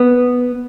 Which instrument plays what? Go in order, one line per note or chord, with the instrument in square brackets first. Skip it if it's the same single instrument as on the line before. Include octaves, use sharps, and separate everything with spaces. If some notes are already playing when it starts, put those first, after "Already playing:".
Already playing: [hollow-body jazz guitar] B3